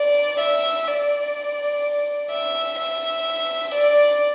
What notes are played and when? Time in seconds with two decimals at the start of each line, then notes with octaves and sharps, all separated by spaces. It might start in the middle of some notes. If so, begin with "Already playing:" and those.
Already playing: D5
0.40 E5
0.88 D5
2.31 E5
2.78 E5
3.74 D5